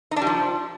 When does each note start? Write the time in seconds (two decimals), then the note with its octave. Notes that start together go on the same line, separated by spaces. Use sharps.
0.11 D#4
0.16 D4
0.22 G3
0.27 F3